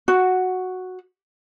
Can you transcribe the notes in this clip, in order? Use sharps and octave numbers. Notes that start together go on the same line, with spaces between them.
F#4